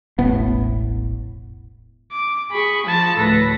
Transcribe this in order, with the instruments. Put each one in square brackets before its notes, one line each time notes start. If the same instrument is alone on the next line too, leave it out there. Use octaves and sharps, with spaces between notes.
[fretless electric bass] E1 A1 A2 B3
[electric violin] D6
[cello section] G#4 [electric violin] B5 C#6
[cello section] F3 [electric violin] A5
[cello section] D2 A2 B4 [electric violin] A4 A#6